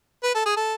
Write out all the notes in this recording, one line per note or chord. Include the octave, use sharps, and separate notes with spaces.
B4
A4
G#4
A4